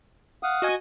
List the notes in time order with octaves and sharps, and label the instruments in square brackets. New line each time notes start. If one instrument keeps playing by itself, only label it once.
[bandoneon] F5 F#5 D#6
[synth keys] F#4 D#5 G#5